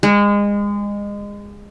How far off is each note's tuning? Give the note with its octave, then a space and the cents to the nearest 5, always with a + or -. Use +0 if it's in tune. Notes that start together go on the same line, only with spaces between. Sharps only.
G#3 -25